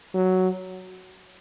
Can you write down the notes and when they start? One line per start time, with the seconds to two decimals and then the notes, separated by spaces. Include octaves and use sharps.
0.14 F#3